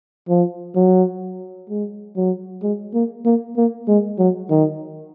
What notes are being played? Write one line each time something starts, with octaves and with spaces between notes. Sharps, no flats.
F3
F#3
G#3
F#3
G#3
A#3
A#3
A#3
G#3
F#3
D#3